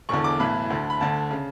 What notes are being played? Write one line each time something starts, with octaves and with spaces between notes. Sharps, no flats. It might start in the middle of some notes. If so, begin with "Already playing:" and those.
E1 E2 D3 C#6
D6
B1 A2 E3 B5
D2 D3
B5
D2 D3 A5
C#3